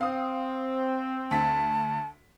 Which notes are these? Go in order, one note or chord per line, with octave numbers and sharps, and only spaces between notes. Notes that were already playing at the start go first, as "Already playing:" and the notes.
C4 F5 D#6
D2 A5 B6